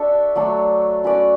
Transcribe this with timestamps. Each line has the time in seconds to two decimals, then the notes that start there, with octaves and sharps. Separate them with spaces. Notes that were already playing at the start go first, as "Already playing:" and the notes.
Already playing: D4 F#4 A4 E5
0.35 F#3 A3 D4
1.04 C#4 F#4 B4 D5